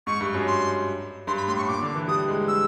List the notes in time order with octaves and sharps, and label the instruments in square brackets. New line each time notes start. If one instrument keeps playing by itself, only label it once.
[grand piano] G#2 [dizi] C#6
[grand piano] G2
F#2
[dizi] C6
[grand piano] G2 [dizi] C6
[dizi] B5
[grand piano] A2 [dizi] C6
[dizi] C#6
[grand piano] A#2 [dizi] D6
[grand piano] D3
E3
[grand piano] G3 [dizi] D#6
[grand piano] G#3
[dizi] E6